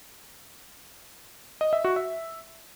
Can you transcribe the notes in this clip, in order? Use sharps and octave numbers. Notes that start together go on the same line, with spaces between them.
D#5
E5
F#4
E5